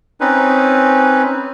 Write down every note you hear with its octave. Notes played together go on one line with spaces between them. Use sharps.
C4 C#4 D#4 B4